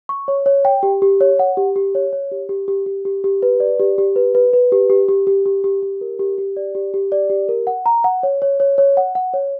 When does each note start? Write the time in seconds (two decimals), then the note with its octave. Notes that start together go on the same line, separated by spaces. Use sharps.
0.09 C#6
0.28 C#5
0.46 C#5
0.65 G5
0.83 G4
1.02 G4
1.21 C#5
1.39 F#5
1.57 G4
1.76 G4
1.95 C#5
2.13 C#5
2.32 G4
2.49 G4
2.68 G4
2.86 G4
3.05 G4
3.24 G4
3.43 B4
3.60 D5
3.79 G4
3.98 G4
4.16 B4
4.35 B4
4.53 B4
4.72 G4
4.90 G4
5.08 G4
5.27 G4
5.46 G4
5.64 G4
5.83 G4
6.01 A#4
6.19 G4
6.38 G4
6.57 D5
6.75 G4
6.94 G4
7.12 D5
7.30 G4
7.49 A#4
7.67 F#5
7.86 A#5
8.04 F#5
8.23 C#5
8.42 C#5
8.60 C#5
8.78 C#5
8.97 F#5
9.15 F#5
9.33 C#5